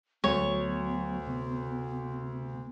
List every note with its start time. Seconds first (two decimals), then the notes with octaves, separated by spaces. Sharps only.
0.24 D2 F#3 B3 C#5
1.27 C3